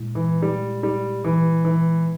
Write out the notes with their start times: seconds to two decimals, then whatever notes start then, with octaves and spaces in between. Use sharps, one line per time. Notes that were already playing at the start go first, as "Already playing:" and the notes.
Already playing: A#2 G#3 E4
0.15 E3
0.42 G3
0.83 G3
1.24 E3
1.65 E3